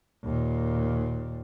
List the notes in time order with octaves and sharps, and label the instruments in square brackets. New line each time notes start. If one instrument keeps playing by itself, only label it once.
[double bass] D#2 A#2